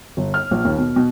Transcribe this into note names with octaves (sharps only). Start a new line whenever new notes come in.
G1
F6
A#1
D#2
B2
B2